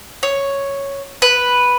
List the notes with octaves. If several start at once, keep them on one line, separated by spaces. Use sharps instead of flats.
C#5
B4